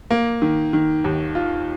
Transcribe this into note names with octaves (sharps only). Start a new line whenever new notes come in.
A#3
D#3
D#3
D#2
F4